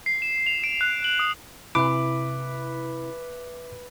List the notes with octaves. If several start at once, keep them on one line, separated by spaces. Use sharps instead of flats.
C7
E7
F7
D7
F#6
F#7
D#6
C3 E4 B4 E5 D6